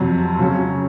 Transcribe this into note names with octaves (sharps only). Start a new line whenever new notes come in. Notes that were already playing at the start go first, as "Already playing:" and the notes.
Already playing: F2 C3 F#3
C#3 F#3 C#4